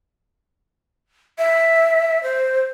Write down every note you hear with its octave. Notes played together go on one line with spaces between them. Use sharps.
E5
C5